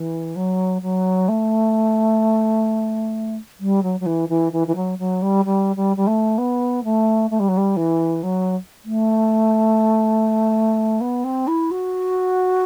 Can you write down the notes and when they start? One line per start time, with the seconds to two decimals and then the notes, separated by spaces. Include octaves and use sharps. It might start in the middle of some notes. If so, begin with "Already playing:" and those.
Already playing: E3
0.36 F#3
0.82 F#3
1.28 A3
3.59 G3
3.83 F#3
4.00 F#3
4.06 E3
4.29 E3
4.52 E3
4.67 E3
4.75 F#3
4.98 F#3
5.22 G3
5.45 G3
5.76 G3
5.96 G3
6.07 A3
6.38 B3
6.84 A3
7.30 A3
7.39 G3
7.48 F#3
7.57 G3
7.76 E3
8.23 F#3
8.85 A3
11.00 B3
11.24 C4
11.47 E4
11.71 F#4